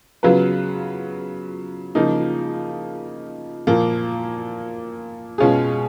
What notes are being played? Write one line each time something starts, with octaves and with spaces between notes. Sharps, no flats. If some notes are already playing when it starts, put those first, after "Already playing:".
C#3 F#3 B3 F4 B4
C#3 F3 A#3 D#4
A#2 F3 A#3
B2 G#3 C#4 F4 G#4